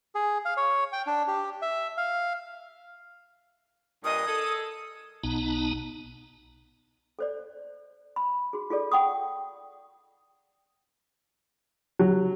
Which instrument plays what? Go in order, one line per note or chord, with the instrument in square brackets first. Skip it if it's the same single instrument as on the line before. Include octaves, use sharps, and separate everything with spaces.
[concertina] G#4
F5
C#5
G5
D4
G4
E5
F5
[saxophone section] G2 A#2 D#5 [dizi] D#6
[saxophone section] G#4 A4
[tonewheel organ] B1 B2 B3 D#4 A5 A#5
[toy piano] A4 C5 D5
B5
F#4 G#4
F4 G#4 A4 D5
F#5 G5 C#6 D#6
[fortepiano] F#3